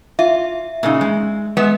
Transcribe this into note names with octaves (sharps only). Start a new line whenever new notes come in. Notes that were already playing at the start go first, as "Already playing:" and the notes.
F4 E5
A#2 C#3 D#4
G#3
G#3 B3 E5